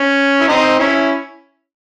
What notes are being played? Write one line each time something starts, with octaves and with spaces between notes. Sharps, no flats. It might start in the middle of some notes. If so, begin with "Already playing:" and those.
Already playing: C#4
E4
C4 D#4
C#4 E4